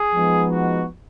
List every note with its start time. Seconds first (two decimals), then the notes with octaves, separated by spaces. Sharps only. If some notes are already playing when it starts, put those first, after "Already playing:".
Already playing: G#4
0.13 F3 G#3 B3 D#4
0.50 F#4